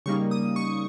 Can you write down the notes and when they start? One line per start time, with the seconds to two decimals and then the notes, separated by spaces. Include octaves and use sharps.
0.06 C#3 G3 A#3 D#4 C#6
0.31 D#6
0.56 C#6